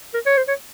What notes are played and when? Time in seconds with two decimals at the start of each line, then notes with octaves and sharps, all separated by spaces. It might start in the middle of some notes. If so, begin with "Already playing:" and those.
0.14 A#4
0.26 C#5
0.37 C5
0.48 C#5